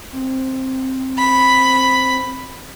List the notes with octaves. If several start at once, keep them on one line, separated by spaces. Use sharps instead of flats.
C4
B5